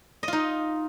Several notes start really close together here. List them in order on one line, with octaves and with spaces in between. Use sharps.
D#5 F4 D#4